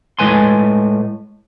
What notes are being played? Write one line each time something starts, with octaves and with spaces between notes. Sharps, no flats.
A2 G#3 B4 G#5 C6